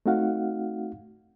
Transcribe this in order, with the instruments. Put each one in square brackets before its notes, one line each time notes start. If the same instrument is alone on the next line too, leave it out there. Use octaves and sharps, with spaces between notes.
[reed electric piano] A3 C4 D#4 F#4 F5 F#5